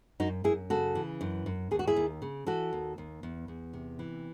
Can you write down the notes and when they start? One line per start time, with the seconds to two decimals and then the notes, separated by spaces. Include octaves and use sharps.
0.20 F#2 D#4 F#4
0.44 F#2 E4 G#4
0.70 C#3 F#4 A4
0.95 E3
1.21 F#2
1.46 F#2
1.71 D#2 G#4
1.79 F#4
1.87 E4 G#4
1.96 D#2
2.22 C#3
2.47 E3 F#4 A4
2.73 D#2
2.98 D#2
3.23 E2
3.48 E2
3.73 C3
3.99 E3